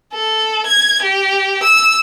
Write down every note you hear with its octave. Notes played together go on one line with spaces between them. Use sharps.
A4
G#6
G4
E6